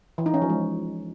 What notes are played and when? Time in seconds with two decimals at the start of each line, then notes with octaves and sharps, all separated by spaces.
0.18 E3
0.26 D#4
0.34 C#4
0.42 F3
0.49 G#3